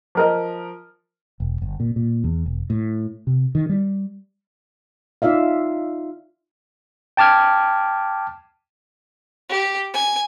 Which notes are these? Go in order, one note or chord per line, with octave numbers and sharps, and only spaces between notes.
F3 A#4 D#5
E1
G1
A#2
A#2
E2
E1
A2
C3
D#3
G3
D#4 F4 D5 E5 F5
G5 A5 D6 F6 G#6
G4
G#5